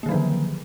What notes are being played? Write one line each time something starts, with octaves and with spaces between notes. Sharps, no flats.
D3 D#3 F3 F#3 A#3